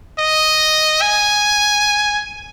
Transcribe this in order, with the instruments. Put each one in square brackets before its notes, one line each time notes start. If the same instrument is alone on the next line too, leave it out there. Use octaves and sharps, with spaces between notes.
[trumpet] D#5
G#5